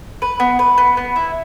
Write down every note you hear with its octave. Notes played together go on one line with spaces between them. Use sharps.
B4
B3
B4
B3
B3
E4